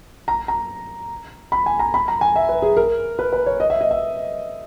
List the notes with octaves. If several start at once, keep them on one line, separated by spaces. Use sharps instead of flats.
A#5
A#5
B5
G#5
A#5
B5
A#5
G#5
E5
B4
G#4
A#4
B4
B4
C#5
D#5
E5
D#5
E5